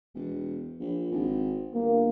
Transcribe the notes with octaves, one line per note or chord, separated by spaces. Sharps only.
E1
A#1
G#1
G1 A#3